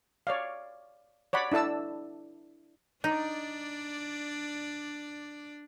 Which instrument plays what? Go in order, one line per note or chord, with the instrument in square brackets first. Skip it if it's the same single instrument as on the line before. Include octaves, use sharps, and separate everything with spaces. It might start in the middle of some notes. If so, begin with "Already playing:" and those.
[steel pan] C#5 D5 F5
C#5 D5 F#5 B5
D4 E4 A4 A5 E6
[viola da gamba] D4 D5 [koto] D#4